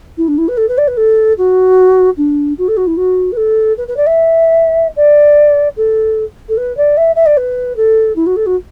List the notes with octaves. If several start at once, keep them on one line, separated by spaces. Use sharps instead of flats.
E4
D4
E4
B4
A4
B4
D5
B4
A4
F#4
D4
F#4
A4
F#4
E4
F#4
B4
A4
B4
B4
D5
E5
D5
A4
A4
B4
D5
E5
E5
D5
B4
A4
E4
F#4
A4
F#4